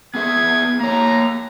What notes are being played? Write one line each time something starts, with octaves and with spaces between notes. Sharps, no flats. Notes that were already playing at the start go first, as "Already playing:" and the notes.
B3 G#4 E5 G#6
A#3 C#5 A#5